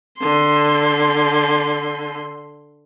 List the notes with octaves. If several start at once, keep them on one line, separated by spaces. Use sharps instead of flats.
D3 C6